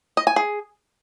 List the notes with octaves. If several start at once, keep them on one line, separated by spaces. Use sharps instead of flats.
D#5
G#5
G#4